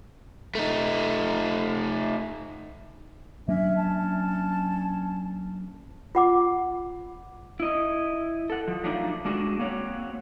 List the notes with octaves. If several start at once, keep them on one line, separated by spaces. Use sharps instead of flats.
A3 D#4
F#3 A#3 C#4 D4 E5
A5
F4 F#5 D6
E4 D#5
A4 F#5
F3
F#3 A3 A#3 D4 D#4 F4
G#3 D4 F#4 G#4
A#3 C4 F#4 C#5